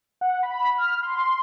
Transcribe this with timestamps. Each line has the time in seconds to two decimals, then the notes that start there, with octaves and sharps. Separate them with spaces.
0.21 F#5
0.43 B5
0.78 F6
1.03 C6